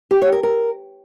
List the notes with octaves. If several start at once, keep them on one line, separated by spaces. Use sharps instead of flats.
G4
C#5
A#4
A#4